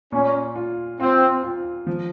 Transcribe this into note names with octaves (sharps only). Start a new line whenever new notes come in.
A#2 C#4
F4
C4 F4
F4
F3